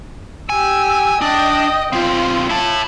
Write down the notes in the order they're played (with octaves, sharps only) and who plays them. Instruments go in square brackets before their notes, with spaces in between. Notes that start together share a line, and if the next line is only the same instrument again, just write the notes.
[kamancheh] G4 E6 [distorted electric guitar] G#5
[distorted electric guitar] D4 [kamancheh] D#5 G5
[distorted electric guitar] B1 C4 [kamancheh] F4
[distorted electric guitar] E4 A5